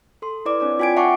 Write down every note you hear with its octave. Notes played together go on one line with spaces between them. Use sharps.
A4 C6
E4 B4 D5 D6
C4 D4 C#5 D5
F4 G5 G#5 G#6 D7
E5 F#5 A5 C#6 D6 C#7